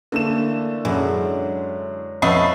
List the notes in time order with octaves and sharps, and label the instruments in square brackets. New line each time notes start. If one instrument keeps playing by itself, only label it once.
[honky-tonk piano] D3 E7 [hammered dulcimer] E3 A3 D4 [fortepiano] A#3
[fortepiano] F#2 [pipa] E3 [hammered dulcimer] G#3 C#4
[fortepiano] F2 [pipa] F#3 A3 D#5 [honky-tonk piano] B4 B5 C7